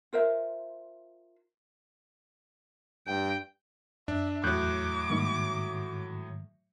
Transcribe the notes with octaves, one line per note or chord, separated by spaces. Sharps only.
F4 A#4 C5 E5
G2 G5
F#2 D4 E5
E2 A2 F#3 D6 F#6 G6
G#2 D#3 G3 A#3 D#4